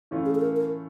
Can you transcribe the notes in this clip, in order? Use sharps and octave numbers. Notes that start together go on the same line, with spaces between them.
A2 E3 A3 C#4 F4
G#4
A4
A#4
A#4